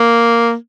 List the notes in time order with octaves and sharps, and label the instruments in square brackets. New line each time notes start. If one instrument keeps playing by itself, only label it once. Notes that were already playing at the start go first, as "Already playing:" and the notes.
Already playing: [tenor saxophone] A#3